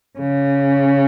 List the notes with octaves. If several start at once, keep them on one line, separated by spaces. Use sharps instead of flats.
C#3